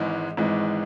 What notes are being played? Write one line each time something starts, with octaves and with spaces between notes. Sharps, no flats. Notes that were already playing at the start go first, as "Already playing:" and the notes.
Already playing: G#1 G#2 E3 G#3
G#1 G#2 E3 G#3